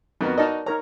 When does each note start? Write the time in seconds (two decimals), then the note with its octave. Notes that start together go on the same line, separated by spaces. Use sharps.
0.21 F2 B3 D#4 F#4 A#4 B4
0.38 D#4 F#4 A#4 D5 D#5 A5
0.66 D#4 A#4 C#5 A#5